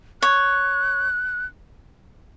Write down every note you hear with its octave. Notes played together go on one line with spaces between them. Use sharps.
C#5 F#6